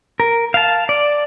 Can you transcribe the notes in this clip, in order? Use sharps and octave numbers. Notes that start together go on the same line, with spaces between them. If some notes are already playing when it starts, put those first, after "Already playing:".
A#4
F5 A5
D5